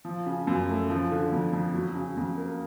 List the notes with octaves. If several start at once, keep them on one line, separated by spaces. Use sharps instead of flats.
F3
C#3
F#2
A3
F3
D3
F2
F2
F#3
C#3
F2
A#3